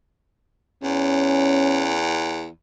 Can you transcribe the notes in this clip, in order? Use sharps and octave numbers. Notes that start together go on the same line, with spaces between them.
E2 C#4